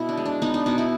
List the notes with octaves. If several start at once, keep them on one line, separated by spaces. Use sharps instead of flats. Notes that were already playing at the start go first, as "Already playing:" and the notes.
Already playing: B2 E4
D4
G#3
D4
B3 D#4
D4
B2 D#4
E4